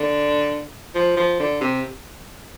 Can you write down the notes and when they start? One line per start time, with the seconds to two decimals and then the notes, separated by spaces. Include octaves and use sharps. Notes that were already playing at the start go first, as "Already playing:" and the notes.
Already playing: D3
0.95 F3
1.17 F3
1.40 D3
1.61 C3